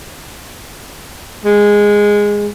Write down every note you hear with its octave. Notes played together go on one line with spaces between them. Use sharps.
G#3